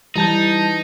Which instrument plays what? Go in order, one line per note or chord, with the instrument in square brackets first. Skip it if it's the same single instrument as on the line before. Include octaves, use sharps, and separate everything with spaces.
[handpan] E3 [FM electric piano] G3 A5 G6 [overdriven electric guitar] D#4